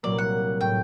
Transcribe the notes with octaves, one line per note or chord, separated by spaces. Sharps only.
C2 A#2 F#3 A#3 D5
F#5
A2 A3 G5